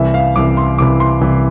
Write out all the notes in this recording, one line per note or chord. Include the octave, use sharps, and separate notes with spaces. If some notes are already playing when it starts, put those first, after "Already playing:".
Already playing: C2 C3 E3 E5
F5
C2 C3 E3 D6
C6
C2 C3 E3 D6
C6
C2 C3 E3